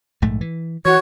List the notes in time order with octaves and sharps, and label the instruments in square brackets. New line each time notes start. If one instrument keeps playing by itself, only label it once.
[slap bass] A#1 G#2 A3
E3
[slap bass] E3 [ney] F#4 [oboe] C#5